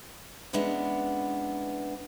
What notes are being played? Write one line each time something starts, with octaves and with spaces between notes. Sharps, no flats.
E3 G#3 B3 C#4 D4